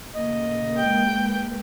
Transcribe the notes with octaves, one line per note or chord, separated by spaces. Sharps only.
A#2 C#3 A3 A#3 D#5
G#3 A#4 B4 G5